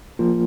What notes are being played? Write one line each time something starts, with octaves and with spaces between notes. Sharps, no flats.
F3 A#3 F4